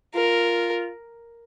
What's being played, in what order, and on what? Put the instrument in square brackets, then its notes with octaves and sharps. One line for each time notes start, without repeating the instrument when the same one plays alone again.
[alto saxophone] F4 [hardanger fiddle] A#4